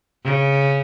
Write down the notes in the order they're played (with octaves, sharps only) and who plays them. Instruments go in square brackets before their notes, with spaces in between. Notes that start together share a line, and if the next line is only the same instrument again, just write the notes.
[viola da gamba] C#3